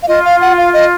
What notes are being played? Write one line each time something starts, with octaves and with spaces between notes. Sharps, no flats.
F5
F4 D#5
F5
F#5
F5
D#5